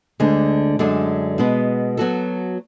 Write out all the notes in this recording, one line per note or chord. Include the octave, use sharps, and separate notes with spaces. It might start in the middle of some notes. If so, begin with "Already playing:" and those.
D2 D3 G#3
F#2 D3 G#3 D4
B2 G#3 B3
F#3 B3 F#4 A4